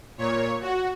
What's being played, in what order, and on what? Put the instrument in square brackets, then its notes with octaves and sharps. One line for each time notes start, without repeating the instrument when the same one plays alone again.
[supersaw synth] A#2 C#5
F#4